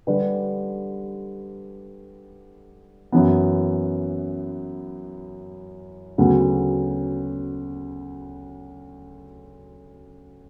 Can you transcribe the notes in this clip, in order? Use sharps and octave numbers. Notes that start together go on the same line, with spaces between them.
D3 G3 D4 G4 B4
F#2 E3 B3
D2 C#3 F#3 B3